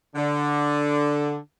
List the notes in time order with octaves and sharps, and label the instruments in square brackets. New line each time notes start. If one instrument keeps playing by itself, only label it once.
[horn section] D3